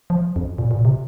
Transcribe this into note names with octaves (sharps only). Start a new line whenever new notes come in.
F3
F2
A#2
A#2
C3